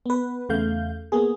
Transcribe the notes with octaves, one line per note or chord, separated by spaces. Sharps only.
B3 B4
E2 C#3 A3 F5 G6
A#3 B3 G#4